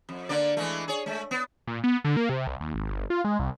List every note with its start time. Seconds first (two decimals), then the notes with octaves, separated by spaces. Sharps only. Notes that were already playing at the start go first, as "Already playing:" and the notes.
0.09 F2
0.29 D3 A#3 D5
0.57 E3 G#3 A3
0.88 G#4 C#5
1.06 G#3 A3
1.31 B3
1.67 A#2
1.84 B3
2.04 D3
2.17 A#3
2.29 C3
2.47 C2
2.61 D#2
2.74 G#1
2.90 G1
3.10 F4
3.25 G#3
3.39 C2